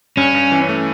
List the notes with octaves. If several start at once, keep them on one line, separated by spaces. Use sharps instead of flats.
G2 C#4
G2
E3
A3